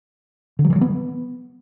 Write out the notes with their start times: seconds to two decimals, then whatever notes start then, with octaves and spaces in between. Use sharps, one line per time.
0.59 D3
0.64 F#3
0.70 E3
0.76 F#3
0.81 B3